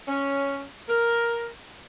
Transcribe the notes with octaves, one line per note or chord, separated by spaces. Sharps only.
C#4
A#4